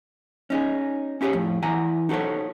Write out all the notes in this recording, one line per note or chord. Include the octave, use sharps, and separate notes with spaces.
C#4 D#4 G#4
C#4 E4 G4 G#4 C#5
F2 A2
E3 E4 F#5 G#5 A#5
D#4 F#4 A4 C5 C#5